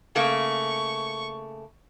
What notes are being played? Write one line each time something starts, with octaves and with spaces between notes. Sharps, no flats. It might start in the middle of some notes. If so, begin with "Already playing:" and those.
C#3 A3 A#3 C#6